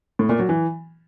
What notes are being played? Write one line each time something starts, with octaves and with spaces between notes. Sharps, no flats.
A2
A#2
F#3
E3